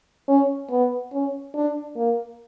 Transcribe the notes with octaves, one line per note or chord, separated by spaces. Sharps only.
C#4
B3
C#4
D4
A#3